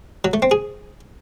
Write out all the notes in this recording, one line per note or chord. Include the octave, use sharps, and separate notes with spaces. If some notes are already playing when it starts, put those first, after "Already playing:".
F#3
A3
C4
G#4